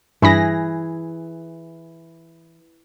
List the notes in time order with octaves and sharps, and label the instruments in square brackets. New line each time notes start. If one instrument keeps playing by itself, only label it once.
[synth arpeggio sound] G2 B5 A#6 [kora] E3 G#4